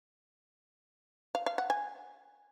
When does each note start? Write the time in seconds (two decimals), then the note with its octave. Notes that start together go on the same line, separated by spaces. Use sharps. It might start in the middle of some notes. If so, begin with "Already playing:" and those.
1.35 F5
1.46 F5
1.58 F#5
1.70 G#5